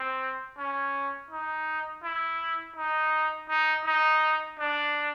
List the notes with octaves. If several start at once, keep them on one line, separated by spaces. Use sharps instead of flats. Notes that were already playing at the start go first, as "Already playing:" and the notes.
Already playing: C4
C#4
D#4
E4
D#4
D#4
D#4
D4